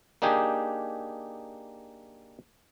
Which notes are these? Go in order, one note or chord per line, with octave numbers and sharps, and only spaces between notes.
A#3 D4 D#4 G4 G#4